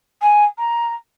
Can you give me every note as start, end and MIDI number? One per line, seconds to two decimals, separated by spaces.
0.21 0.44 80
0.58 0.93 82